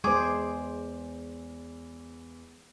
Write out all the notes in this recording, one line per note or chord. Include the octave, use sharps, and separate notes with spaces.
E2 G#3 G#4 C5 D6